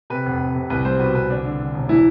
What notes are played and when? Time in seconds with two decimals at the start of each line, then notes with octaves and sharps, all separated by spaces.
0.10 C3 B4
0.26 F1
0.40 F1
0.56 C3
0.70 C2 B4
0.85 G3 C5
1.00 B2 B4
1.14 C2 B4
1.29 D3 D4
1.45 D3
1.59 D3
1.74 E1
1.89 E3 E4